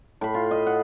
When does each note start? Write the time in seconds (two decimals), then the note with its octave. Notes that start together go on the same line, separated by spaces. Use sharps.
0.21 A2 B5
0.34 F4
0.51 D#5
0.66 F#5